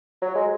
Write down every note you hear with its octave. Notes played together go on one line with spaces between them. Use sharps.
F#3
G#3